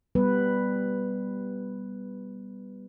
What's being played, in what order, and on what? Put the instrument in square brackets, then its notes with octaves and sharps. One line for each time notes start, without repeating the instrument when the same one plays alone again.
[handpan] G3 B3 B4